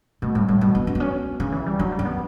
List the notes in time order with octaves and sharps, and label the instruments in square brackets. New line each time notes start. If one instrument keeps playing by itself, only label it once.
[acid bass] B2 [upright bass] A3
[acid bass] A2 [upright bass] G3
[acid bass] A2 [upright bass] G3
[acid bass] B2 [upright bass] G3
[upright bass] B3
C#4
B3
C#4
[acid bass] C#3 [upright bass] C#4
[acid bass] E3
G3
[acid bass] F#3 [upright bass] D4
[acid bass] G3
[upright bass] C#4
[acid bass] B3